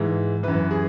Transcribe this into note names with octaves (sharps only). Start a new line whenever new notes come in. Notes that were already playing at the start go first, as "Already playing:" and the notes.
Already playing: G#2 E3
F#2 E3 B4
G#4